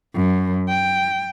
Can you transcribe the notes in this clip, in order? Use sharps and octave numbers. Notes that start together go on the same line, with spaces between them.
F#2
G5